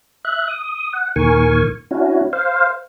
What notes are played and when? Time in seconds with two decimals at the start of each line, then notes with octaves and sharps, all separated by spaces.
0.25 E5 F#6
0.48 D#6
0.93 F#5
1.16 D#2 A#2 D#3 A#4 G#5 C#6
1.91 C#4 D4 E4 F#4
2.33 C5 F5